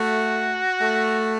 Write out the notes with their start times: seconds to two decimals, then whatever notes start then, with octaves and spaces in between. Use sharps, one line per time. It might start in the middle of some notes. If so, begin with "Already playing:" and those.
Already playing: A3 F#4
0.80 A3